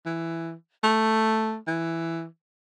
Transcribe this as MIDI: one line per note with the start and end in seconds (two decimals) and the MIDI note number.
0.06 0.54 52
0.84 1.57 57
1.67 2.25 52